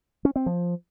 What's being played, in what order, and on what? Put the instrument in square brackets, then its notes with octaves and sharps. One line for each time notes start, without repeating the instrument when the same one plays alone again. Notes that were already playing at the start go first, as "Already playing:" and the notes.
[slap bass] C#4
C4
F3